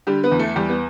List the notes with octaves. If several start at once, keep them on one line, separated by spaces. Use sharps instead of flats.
D3 G3 G4
B3 B4
E2
A3 A4
E2 G3 G4
B3